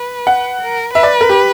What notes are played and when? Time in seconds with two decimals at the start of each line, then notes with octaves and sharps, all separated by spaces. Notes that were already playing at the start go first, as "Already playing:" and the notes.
Already playing: B4
0.27 F#5
0.61 A#4
0.94 B4 E5
1.03 D5
1.21 A#4
1.29 G4